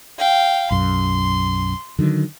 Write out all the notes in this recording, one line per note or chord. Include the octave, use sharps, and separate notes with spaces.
F5 G5
B1 F#2 C6
D3 D#3 F#3